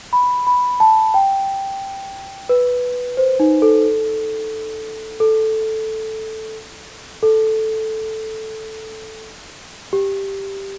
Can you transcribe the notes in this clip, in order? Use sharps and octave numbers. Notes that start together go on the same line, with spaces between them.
B5
B5
A5
G5
B4
C5
D#4
A4
A4
A4
G4